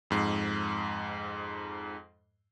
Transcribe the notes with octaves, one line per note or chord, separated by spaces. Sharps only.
F2 G#2 C7